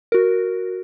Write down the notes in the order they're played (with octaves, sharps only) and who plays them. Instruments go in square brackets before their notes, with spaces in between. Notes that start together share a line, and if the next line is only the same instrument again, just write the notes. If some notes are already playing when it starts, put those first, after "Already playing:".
[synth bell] F#4 A#4